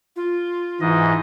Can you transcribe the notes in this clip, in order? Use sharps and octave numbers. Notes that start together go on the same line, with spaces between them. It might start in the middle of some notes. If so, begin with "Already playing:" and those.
F4
G#2 E3 D#5